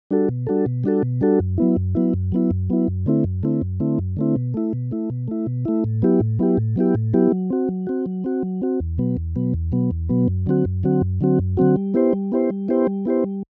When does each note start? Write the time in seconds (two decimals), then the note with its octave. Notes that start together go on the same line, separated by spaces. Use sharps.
0.11 G3 D4 F#4 A4
0.29 B2
0.47 G3 D4 F#4 A4
0.66 B2
0.84 G3 D4 F#4 A4
1.03 B2
1.21 G3 D4 F#4 A4
1.40 F#2
1.58 F#3 B3 E4
1.77 F#2
1.95 F#3 B3 E4
2.14 F#2
2.32 F#3 B3 E4
2.51 F#2
2.70 F#3 B3 E4
2.88 F#2
3.06 D3 A3 C4 E4
3.24 F#2
3.43 D3 A3 C4 E4
3.62 F#2
3.80 D3 A3 C4 E4
3.99 F#2
4.17 D3 A3 C4 E4
4.36 B2
4.54 A3 E4
4.73 B2
4.91 A3 E4
5.10 B2
5.28 A3 E4
5.47 B2
5.65 A3 E4
5.84 A2
6.02 F#3 B3 E4 G4
6.20 A2
6.39 F#3 B3 E4 G4
6.57 A2
6.76 F#3 B3 E4 G4
6.95 A2
7.14 F#3 B3 E4 G4
7.32 F#3
7.50 C4 F#4
7.68 F#3
7.87 C4 F#4
8.06 F#3
8.24 C4 F#4
8.43 F#3
8.62 C4 F#4
8.80 E2
8.98 B2 F#3 B3
9.17 E2
9.36 B2 F#3 B3
9.54 E2
9.72 B2 F#3 B3
9.91 E2
10.09 B2 F#3 B3
10.28 F#2
10.46 D3 F#3 C4 F#4
10.65 F#2
10.83 D3 F#3 C4 F#4
11.01 F#2
11.21 D3 F#3 C4 F#4
11.39 F#2
11.57 D3 F#3 C4 F#4
11.76 G3
11.94 B3 E4 G4 C5
12.13 G3
12.32 B3 E4 G4 C5
12.50 G3
12.68 B3 E4 G4 C5
12.87 G3
13.05 B3 E4 G4 C5
13.24 G3